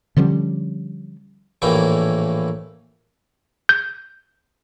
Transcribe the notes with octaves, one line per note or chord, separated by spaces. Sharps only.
D3 F3 G3 C#4
A#1 A2 E3 A#3 G5
G6